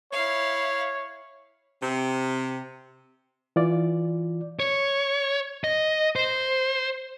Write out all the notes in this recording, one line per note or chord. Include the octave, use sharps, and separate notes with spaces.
E4 C#5 F5
C3
E3 F4 D5
C#5
D#5
C5